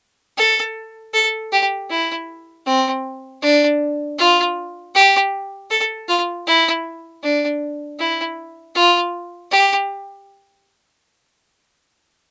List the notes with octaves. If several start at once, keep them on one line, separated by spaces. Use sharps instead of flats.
A4
A4
G4
E4
C4
D4
F4
G4
A4
F4
E4
D4
E4
F4
G4